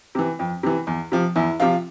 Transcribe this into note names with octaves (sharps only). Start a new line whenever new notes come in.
C3 E3
F2
C3 E3
E2
C3 F3
E2 E4
C3 F3 F4